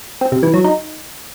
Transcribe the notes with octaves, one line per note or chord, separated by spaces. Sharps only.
C4
C3
E3
F#3
D#4